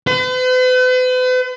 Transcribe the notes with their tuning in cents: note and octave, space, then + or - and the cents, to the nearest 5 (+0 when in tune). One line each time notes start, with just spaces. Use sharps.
B4 +45